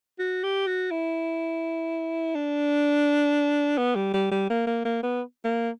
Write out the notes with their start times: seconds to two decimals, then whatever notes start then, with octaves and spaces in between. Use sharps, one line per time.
0.19 F#4
0.43 G4
0.67 F#4
0.91 E4
2.35 D4
3.78 B3
3.95 G3
4.14 G3
4.31 G3
4.50 A#3
4.67 A#3
4.85 A#3
5.03 B3
5.44 A#3